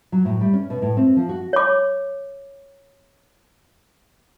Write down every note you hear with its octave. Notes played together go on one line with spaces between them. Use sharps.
F#3
A2
G3
C#4
B2
A2
C4
F3
F#4
C#5 D6